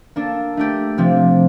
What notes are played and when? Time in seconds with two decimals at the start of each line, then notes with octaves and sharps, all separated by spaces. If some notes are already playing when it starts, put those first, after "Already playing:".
0.16 A#3 D4 A4
0.57 A3 D4 G4
0.98 C3 F3 C4